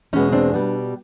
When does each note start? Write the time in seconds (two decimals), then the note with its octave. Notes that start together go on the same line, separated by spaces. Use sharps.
0.13 E2 B2 G#3 B3 C#4 D#4
0.33 C4 D4
0.54 B2 G3 B3